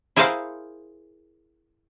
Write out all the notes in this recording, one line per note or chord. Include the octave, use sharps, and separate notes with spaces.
E4 G#4 A#4 C5 F5 F#5